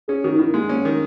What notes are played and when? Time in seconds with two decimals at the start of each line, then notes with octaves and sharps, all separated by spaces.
0.08 C#4 G#4
0.24 D#3 F#4
0.32 D#4
0.39 D#3 E4
0.54 G#3 A#3
0.69 A#3 C#4
0.85 D#3